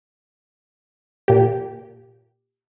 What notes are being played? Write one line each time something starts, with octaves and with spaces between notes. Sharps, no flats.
A#2 G4